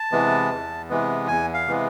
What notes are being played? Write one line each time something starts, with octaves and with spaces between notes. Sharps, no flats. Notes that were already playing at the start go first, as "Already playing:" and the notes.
Already playing: A5
C3 E3 G#3 B3
E2
C3 E3 G#3 B3
E2 G#5
F5
C3 E3 G#3 B3